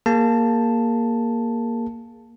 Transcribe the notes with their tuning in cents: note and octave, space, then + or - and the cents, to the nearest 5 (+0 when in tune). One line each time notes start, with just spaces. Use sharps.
A#3 +0 G#4 +0 A5 +0